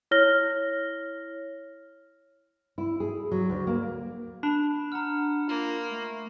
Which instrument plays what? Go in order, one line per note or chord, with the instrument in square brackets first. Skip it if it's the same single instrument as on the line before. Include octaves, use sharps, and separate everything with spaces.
[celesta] E4 C#5 F6 A#6 G7
[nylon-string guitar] E4
G#4
F#3
D2
A#3
[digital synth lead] D4 [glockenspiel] B5
[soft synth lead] F#5 [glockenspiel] A#5 F6
[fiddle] A#3 [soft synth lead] F4
[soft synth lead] A3